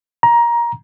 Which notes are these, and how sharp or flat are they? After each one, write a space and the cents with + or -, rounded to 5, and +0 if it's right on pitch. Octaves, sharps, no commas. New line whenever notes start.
A#5 +20